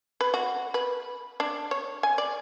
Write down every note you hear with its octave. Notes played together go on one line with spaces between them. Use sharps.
B4
F#4
B4
D4
C#5
G#5
D5